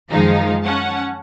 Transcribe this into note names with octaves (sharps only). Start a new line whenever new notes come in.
F#2 D#3 F3 G#3 D#4 F5
C#4 F#5 A5